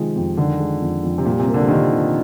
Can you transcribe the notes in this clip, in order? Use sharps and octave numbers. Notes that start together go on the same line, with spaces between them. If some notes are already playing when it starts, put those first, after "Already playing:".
Already playing: C3 D#3 F3 G#3
F2
D3 D#3
G#3
F2
F2
C3
A#2 G3
C3
A#3
D3
F3
C3 D#3
C3